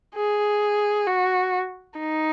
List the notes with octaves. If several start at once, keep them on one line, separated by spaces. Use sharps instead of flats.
G#4
F#4
D#4